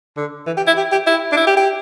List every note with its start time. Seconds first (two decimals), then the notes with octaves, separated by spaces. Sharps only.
0.17 D3
0.47 E3
0.57 G4
0.67 E4
0.77 G4
0.92 G4
1.07 E4
1.32 D4
1.37 E4
1.47 G4
1.57 G4